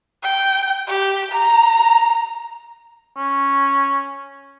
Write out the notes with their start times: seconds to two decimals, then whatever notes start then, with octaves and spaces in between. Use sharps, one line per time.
0.23 G5
0.87 G4
1.31 A#5
3.16 C#4